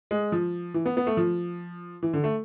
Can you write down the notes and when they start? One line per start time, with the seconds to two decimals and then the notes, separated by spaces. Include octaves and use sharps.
0.11 G#3
0.32 F3
0.74 E3
0.86 B3
0.97 B3
1.07 A3
1.17 F3
2.03 E3
2.13 D3
2.24 A3